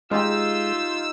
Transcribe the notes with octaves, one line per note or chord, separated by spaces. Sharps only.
G#3 D#4 F4 G4 E6